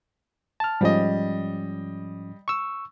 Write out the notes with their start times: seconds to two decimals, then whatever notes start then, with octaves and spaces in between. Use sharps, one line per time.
0.60 A5 F6
0.81 G#2 F3 G3 C#4 D#5
2.48 C#6 E6